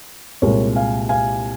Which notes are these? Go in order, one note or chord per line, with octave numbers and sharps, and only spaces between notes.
C2 A#2 G#3 A#4 C#5
F5 G#5
F5 G#5